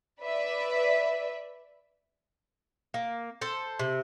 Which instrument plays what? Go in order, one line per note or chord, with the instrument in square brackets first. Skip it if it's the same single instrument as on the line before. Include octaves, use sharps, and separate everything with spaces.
[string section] B4 D5 E5
[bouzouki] A#3
A4 C5
C3